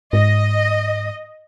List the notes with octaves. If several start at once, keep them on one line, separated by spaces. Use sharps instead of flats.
G#2 D#5